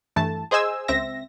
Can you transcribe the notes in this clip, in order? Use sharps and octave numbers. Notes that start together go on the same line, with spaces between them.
G2 E3 A3 A5
G#4 C5 D#5 G#5 E6
C#2 C4 E5 A#6